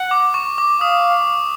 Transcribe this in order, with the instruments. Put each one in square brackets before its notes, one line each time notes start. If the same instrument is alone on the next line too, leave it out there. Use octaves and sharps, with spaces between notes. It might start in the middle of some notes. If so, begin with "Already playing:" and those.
Already playing: [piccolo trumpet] F#5
[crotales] D6
C#6
D6
[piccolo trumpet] F5 [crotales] D#6